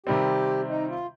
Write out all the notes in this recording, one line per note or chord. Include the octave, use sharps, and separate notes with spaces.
C3 D#3 G3 C4 G4
D#4
F4